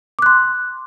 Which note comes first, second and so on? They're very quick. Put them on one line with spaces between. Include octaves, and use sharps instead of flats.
D6 F#6 C6